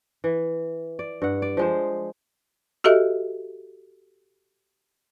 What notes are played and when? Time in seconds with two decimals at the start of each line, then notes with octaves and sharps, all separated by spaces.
0.24 E3
0.99 D5
1.22 G2 F#5
1.42 D5
1.57 F3 G#3 C5
2.84 F#4 G4 A4 D#5 E5